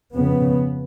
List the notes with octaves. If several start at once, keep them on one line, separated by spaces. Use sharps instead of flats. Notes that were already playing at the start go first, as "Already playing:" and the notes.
F2 C#3 B3